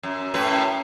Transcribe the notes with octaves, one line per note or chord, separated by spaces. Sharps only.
F#2
F#2 A2 B4